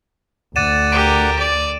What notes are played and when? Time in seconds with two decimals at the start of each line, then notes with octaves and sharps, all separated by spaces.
0.56 D2 D5 F#5 A6 D#7 E7
0.92 G4 A#4 D7
1.39 D5